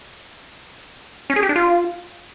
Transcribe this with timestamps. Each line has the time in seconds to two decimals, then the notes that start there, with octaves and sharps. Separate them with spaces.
1.30 C#4
1.36 G#4
1.43 G4
1.49 D4
1.56 F4